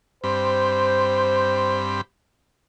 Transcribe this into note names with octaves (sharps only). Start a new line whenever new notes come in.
G2 C4 C5 B5